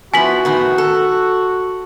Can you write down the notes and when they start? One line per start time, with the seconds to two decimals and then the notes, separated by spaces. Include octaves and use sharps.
0.14 F3 B3 E4 F#4 G#5 B6 F#7
0.45 A2 D#3 B3
0.78 A4